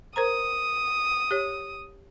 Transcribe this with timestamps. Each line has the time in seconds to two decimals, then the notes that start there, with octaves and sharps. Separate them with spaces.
0.16 A#4 C5 A#5 D#6
1.31 G4 C#5